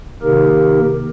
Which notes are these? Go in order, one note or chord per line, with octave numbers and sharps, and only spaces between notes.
C3 D#3 A#3 D#4 G4 A#4